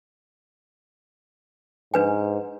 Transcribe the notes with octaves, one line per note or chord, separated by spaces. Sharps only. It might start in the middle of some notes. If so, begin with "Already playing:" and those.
G#2 D4 B4 G#5